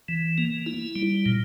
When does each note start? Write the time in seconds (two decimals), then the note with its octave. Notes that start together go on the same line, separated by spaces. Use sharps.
0.08 E3
0.38 A#3
0.66 E4
0.96 G3
1.26 A#2